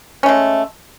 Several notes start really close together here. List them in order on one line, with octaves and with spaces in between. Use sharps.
C#4 A3 G#3